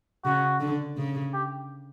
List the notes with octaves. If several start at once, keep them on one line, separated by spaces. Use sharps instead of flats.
C#3 F#4
D3
C#3
G4